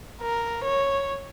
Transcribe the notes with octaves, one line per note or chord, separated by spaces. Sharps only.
A#4
C#5